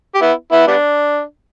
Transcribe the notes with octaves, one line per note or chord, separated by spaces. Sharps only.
G4
B3 E4
B3 E4
G3 B3 D4